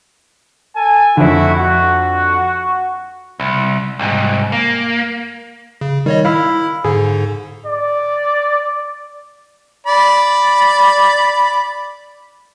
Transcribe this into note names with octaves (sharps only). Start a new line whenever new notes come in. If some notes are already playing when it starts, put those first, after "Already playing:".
A4 G#5 A5
F2 D3 A3 E4 F#4
F#4
C2
C2 G#2
A#3
C#3
D#3 G3 C#5 D#5
E4 F5 B5 E6
G#2 D3 G#4
D5
D5 B5